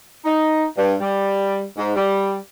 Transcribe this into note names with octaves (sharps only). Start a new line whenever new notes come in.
D#4
G2
G3
G#2
G3